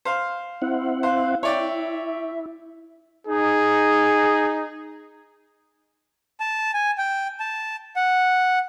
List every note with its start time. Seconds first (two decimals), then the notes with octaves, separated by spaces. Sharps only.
0.05 C5 F5
0.62 C4 E4 F#5
1.03 C5 F5
1.43 E4 C#5 D5 E5 G5
3.27 D#4 G#4
6.40 A5
6.74 G#5
6.98 G5
7.40 A5
7.96 F#5